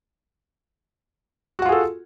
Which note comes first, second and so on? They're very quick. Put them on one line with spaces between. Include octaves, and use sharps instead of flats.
F#4 F#5 F4 G#4 A4